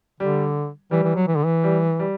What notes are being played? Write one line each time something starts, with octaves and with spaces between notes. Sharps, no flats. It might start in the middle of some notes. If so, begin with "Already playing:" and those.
D3 G3
E3 G3
E3
F#3
E3
D3
E3
G3
G3